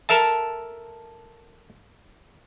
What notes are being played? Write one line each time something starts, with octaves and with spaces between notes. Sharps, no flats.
A4 A#4 E5 A5